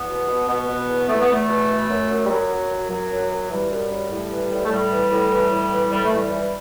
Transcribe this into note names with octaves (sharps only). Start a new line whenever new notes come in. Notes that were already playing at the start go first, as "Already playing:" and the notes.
Already playing: E2 B3
B2
B2
B2 B3
B2
E2
E2 A3
B3
E2 A3
B2
E3
F#2
F#2
G3
F#2 F#3
F#2
F#2
F#2 F#3
F#2
F#2
E3 G3
F#2
F#2
A2
E3
A2
A3
A2 G3
E3
A2
E3
A2
E3
A2 G3
A3
E3 G3
E3